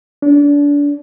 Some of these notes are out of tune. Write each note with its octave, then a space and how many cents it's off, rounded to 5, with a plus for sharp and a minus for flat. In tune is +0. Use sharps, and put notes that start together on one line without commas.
D4 -30